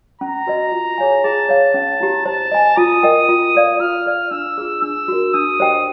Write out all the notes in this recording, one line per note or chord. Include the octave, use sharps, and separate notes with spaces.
C#4 A#5
F#4 B4 D#5
F4
G#4 C#5 F5 G#5
G#4 A5
C#5 F5
C#4
E4 G4
C5 A5
D#5 G#5
F4 D#6
A#4 D#5 G5
F4
A4 D5 F5
F4 F6
A4 D5 F5
D4 E6
F4 G#4
D4 E6
F#4 A#4
D4 D#6
G4 C5 D#5 G5